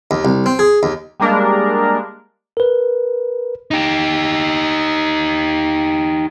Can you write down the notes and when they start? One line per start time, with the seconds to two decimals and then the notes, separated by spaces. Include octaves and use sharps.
0.11 D#2
0.25 C2
0.46 C4
0.59 G#4
0.83 D#2
1.20 G3 G#3 A#3 D4 A#4
2.57 A#4 B4
3.71 D#4 G4